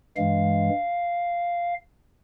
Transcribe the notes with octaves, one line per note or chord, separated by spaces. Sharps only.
G2 E3 G#3 F5